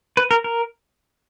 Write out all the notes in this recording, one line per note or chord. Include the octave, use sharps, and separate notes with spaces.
B4
A#4
A#4